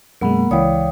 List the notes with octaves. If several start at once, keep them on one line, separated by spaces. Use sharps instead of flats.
F#2 B2 G#3 A#3 A#4 F#5 B5
C#2 E3 C#5 D5 F5 G5 D#6